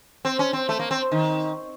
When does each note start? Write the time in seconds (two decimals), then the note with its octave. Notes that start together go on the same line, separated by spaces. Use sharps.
0.25 C4
0.39 C#4
0.53 C4
0.69 A3
0.79 A#3
0.91 C4
1.12 D#3